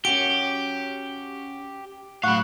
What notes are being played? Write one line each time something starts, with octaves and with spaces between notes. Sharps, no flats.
C#4 F#4 G4 D7 G7
A2 F#3 F5 F#5 B5 C#6